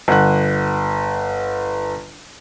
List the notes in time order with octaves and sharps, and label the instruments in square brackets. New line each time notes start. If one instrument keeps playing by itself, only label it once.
[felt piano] G1 F#5 F#6